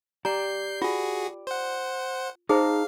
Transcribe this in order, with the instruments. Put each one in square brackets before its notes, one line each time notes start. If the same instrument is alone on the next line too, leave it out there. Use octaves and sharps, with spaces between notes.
[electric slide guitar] G4 D5 [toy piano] A#5 [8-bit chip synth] G6 C7
[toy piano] F4 [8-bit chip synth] F#4 G#4
[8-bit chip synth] C5 F#5
[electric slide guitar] D#4 A5 A#5 [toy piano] G#4 C5 [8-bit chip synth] F5